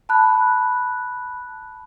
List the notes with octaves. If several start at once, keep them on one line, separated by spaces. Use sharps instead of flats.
A5 B5 F#6